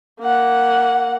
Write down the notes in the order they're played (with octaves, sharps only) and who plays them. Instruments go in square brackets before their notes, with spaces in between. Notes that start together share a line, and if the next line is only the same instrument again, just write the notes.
[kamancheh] A#3 F#5